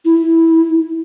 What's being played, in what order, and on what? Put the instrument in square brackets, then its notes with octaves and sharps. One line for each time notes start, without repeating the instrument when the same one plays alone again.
[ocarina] E4